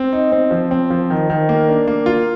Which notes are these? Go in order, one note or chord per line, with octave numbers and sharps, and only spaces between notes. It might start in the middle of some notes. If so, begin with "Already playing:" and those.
Already playing: C4
D#4
C4
F3
C4
F3
D#3
D#3
A#3
D4
A#3
F4